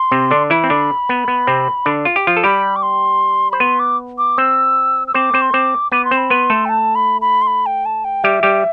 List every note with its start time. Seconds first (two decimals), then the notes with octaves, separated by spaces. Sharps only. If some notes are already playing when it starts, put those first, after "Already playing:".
Already playing: C6
0.12 C3 C4
0.31 D3 D4
0.50 E3 E4 B5
0.64 C4
0.70 D3 D4
1.09 B3
1.28 B3
1.47 C3 C4
1.86 D3 D4
2.05 F4
2.16 G4
2.27 F3 F4
2.37 A4
2.44 G3 G4 B5
2.76 D6
2.83 C6
3.51 C5 B5
3.60 B3 B4 C6
3.79 D6
4.18 D6
4.38 C4 C5 E6
5.07 E6
5.14 C4 C5 D6
5.34 C4 C5
5.41 C6
5.54 C4 C5 D6
5.92 B3 B4 D6
6.05 C6
6.11 C4 C5
6.17 B5
6.30 B3 B4 C6
6.50 A3 A4
6.65 G5
6.69 A5
6.95 B5
7.21 B5
7.42 C6
7.47 B5
7.66 G5
7.85 A5
8.04 G5
8.24 G3 G4 E5
8.43 G3 G4